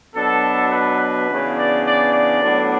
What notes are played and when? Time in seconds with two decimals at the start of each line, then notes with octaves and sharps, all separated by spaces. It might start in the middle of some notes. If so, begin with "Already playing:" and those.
0.15 B2 F#3 B3 D4 A4
0.71 B4
1.29 C#3 E3 B3 D4
1.57 D5
1.85 D5
2.13 D5
2.41 A2 F#3 B3 D4